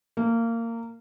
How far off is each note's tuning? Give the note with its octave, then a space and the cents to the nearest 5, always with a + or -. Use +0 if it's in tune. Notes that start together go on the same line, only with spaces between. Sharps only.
A#3 -20